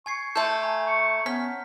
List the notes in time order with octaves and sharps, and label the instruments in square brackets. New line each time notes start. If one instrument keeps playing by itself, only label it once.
[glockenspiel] G#5 G#6 C7 [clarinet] C#6
[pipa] A3 A4 [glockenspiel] A5 C6 G6 [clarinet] C#6
[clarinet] G#5 [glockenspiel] A#5
[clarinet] C#6
[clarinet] B3 [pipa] C#4 [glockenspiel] F6 B6